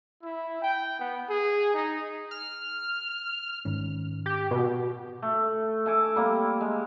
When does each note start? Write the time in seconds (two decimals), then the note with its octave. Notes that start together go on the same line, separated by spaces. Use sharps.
0.23 E4
0.63 G5
0.99 B3
1.29 G#4
1.74 D#4
2.31 F6
3.65 G#2 D#3 C#4
4.26 G4
4.51 B2
5.22 A3
5.86 A3 A4 G#5 D6
6.16 G3 A#3 C4
6.61 G#3